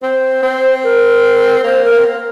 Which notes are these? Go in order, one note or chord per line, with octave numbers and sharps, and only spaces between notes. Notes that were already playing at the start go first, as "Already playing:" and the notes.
C4 C5
C4
A#4
A#3 C5
A#4
A#3
C4
A#3